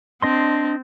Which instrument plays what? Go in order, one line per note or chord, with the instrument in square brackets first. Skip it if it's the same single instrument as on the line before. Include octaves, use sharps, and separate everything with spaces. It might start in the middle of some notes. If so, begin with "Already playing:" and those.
[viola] C4 [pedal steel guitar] D4 D#5 C6